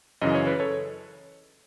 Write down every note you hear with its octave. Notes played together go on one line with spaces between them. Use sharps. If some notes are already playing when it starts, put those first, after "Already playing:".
F#2 C#3 E3 D#5
C#5
B4
A4 C#5